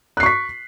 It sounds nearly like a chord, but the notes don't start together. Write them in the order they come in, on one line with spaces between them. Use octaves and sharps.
F#6 C7 C#6 B6